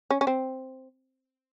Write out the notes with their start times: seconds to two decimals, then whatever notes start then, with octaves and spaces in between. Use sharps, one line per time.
0.11 C#4
0.21 C#4
0.27 C4